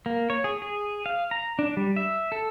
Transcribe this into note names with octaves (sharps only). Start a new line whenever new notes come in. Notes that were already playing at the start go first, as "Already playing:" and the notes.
A#3
C#5
G#4
G#4
F5
A#5
D4
G3
E5
A4